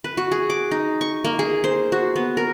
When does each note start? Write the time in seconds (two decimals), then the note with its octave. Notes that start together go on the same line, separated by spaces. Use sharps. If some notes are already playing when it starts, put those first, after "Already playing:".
0.04 B4
0.17 F#4
0.32 G#4
0.50 D6
0.71 D#4
1.01 C#6
1.25 A#3
1.39 G#4
1.64 C5
1.92 F#4
2.16 B3
2.37 A#4